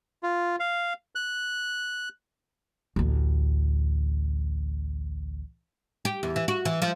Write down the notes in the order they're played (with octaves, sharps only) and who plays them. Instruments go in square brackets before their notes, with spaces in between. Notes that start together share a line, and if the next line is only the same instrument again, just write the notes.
[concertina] F4
F5
F#6
[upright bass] A1 D2
[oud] G4
E2
E3
F#4
E3
F3